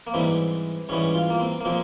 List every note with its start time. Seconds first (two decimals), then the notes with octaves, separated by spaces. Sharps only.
0.07 A#3
0.14 G#2 E3 G3 C4
0.89 G#2 E3 G3 C#4
1.14 F4
1.30 A#3
1.40 C4
1.60 A#3
1.65 A#2 F3 G#3 C4